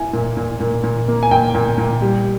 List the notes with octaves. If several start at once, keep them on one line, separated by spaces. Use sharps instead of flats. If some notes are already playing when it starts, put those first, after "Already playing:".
Already playing: E4 G#5
A#2
A#2
A#2
A#2
A#3
G#5
A#2 G5
A#2
A#2
G3